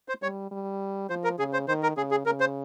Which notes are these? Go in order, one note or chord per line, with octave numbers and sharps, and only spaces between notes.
C5
G3 C#5
G3
F3 C5
A#4
C#3 G#4
C5
D#3 C5
A#4
C#3 G#4
G#4
C#3 A#4
C5